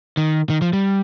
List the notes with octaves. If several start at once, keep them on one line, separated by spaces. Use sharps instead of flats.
D#3
D#3
F3
G3